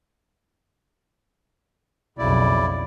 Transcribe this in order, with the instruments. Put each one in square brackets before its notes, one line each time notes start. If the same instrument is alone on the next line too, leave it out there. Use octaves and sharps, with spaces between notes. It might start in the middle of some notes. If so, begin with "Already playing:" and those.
[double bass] B1 F2 [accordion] C#3 E4 D5